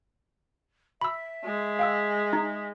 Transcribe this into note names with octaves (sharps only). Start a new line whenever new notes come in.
E5 B5 E6
G#3
F5 G5 E6
D#4